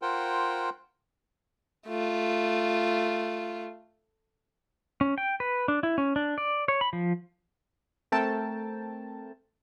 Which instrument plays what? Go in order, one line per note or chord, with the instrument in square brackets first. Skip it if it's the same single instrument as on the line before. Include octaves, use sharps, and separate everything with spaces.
[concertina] F4 A#4 C5 F#5 G5
[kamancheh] A3 F4
[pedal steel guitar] C#4
G5
B4
D4
E4
C#4
D4
D5
C#5
B5
F3
[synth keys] A3 C4 A4 A#4 G5 A5